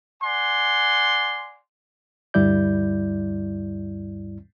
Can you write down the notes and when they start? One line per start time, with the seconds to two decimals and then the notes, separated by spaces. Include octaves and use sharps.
0.23 D5 F#5 G#5 C6
2.34 D2 G2 G3 E4 D5 G6